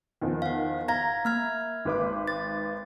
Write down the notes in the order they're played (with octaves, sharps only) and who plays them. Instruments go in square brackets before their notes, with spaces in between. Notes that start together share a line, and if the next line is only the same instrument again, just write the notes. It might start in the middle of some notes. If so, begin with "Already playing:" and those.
[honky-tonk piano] E2 D#3 F3
[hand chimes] F5 F#5
[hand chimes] F5 G#6 A#6 [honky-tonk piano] A#5
[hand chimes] A#3 F6 G#6
[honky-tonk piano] G#1 B4 D6
[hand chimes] A6